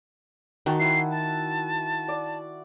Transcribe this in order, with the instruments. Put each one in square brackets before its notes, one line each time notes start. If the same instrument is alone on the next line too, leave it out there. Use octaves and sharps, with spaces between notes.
[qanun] D#3 [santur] F#4 G5 A5
[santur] E4 F#5 [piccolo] C7
[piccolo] A5
[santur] D5